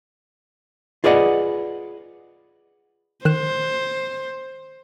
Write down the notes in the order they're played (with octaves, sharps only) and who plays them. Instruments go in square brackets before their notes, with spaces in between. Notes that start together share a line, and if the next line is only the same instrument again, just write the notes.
[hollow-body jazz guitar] F4 G#4 B4 D5 D#5 F#5
[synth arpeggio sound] D#3 F#6 E7 [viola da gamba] C5